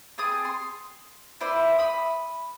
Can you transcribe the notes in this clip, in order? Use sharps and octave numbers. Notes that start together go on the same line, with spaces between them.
C4 G#4 A5 D#6
C6
E4 B4 C5 D5
B5 D#6